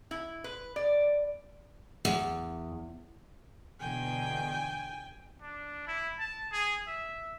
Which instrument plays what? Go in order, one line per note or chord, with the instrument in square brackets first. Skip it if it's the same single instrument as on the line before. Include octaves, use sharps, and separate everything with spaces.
[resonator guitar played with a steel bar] E4
B4
D5
[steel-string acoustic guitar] E2
[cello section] E2 B2 D3 [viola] G5 G#5
[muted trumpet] D4
E4
A5
G#4
E5